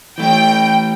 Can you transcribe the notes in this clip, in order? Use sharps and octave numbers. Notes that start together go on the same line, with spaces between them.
E3 A3 G5